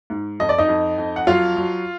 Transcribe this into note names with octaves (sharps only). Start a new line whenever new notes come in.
G#2
F2 D#5
D5
D#4 D#5
F2
F2
F#5
F#3 F4 F5
F#3